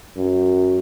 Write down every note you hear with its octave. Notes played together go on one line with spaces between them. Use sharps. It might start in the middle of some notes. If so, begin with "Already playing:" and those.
F#2